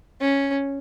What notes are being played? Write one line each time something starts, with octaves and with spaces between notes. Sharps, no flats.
C#4